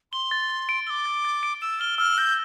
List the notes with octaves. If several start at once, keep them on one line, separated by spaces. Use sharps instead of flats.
C6 G7
A6
A6
D7
D6 E6 G7
A6
A6
D7
E6 E7
F6 G7
E6 F6
G6 A#6